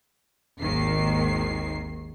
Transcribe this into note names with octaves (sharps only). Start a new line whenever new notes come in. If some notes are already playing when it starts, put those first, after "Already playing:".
G#1 D#2 D#3 C7